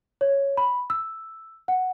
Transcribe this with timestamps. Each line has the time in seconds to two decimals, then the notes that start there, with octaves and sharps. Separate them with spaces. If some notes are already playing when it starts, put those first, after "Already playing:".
0.21 C#5
0.57 B5
0.90 E6
1.68 F#5